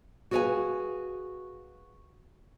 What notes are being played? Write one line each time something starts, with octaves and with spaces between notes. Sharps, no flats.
F#4 G#4 B4 D5 F5 G#5